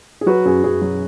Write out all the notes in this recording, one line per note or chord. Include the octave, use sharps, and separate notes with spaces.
G#4
F#3 F#4 B4
F#2 G#4
F#2 G#4
F#3